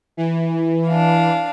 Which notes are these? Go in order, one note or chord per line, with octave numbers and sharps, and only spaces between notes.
E3
D4 F5